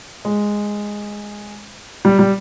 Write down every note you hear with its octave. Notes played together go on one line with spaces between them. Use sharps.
G#3
G3
G3